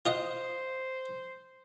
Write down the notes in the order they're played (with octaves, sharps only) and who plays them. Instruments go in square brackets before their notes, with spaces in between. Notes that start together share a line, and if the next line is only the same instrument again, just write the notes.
[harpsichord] F4 D#5 F#5 [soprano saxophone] C5